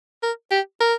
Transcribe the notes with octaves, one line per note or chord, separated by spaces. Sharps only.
A#4
G4
A#4